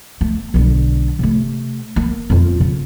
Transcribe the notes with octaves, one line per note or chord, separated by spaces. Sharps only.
A3
B1 D3
C3 A3
A#3
F2 F4
C#3